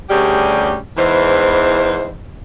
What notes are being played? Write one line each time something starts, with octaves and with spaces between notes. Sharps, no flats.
D2 G3 C#4 G4 G#4
E2 G#2 E3 C5